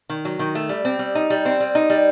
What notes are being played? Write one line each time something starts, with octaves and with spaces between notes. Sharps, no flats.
D#3
F#3
D#3
A3
G3
C4
G3
D#4
G3
C4
G3
D#4
G3